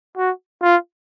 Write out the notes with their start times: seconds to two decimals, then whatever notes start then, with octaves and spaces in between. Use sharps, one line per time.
0.17 F#4
0.62 F4